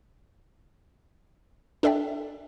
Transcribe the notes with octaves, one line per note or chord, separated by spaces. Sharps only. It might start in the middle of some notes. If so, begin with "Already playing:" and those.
D4 A4 D5 E5 G5